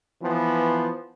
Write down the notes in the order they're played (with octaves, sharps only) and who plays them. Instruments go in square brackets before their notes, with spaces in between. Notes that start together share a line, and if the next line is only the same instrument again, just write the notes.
[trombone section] E3 F3 B3